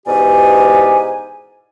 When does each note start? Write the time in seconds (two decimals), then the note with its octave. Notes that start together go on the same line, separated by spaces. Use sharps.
0.07 E2 G#2 B2 G4 D5 G#5